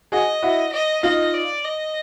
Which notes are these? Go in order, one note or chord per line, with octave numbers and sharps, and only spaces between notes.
F#4 G#4 D#5
E4 F#4
D#5
D#4 F4 D#5
D5
D#5